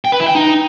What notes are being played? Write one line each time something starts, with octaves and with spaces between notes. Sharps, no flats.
G5
B4
E4
G5
D#4